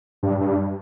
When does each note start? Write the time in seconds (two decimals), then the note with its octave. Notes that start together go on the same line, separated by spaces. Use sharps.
0.23 G2
0.41 G2